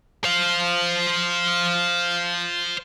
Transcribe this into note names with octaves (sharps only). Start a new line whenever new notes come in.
C5 F5